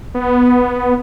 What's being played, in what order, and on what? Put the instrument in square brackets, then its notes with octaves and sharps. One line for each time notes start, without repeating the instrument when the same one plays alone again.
[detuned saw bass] B3